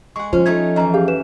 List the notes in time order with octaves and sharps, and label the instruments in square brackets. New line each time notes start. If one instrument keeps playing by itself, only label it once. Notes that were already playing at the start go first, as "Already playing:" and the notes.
[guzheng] G#3 F#5 [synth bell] C#6
[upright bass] F3 [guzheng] C#4 [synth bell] F4 [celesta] C5
[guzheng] A3 D#4 E5 [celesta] G#6
[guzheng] F#2 E3 [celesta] D#5 A#5
[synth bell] G4 F5 [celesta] G#4
[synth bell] B4 [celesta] E7